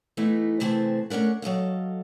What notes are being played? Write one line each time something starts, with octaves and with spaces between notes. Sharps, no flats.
E3 A3 B3 D#4
C3 E3 A3 C4 G#4 A5
A3 C#4 D4 A#4 F#5
F#3 A4 D#5 F5